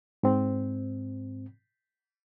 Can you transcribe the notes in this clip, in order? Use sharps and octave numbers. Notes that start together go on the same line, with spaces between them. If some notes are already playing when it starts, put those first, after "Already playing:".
G#2 C4